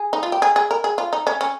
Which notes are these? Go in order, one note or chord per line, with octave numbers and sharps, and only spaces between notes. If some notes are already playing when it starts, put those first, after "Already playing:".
Already playing: G#4
D#4
F4
G4
G#4
G#4
A#4
G#4
F4
D#4
C#4
C#4